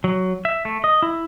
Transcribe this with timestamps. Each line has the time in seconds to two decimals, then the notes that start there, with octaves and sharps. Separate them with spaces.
0.04 F#3
0.45 E5
0.65 A3
0.84 D#5
1.02 E4